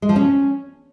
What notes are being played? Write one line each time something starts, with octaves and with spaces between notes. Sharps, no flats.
G#3
F3
C#4